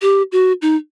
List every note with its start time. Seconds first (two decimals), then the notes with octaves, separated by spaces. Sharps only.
0.02 G4
0.32 F#4
0.62 D#4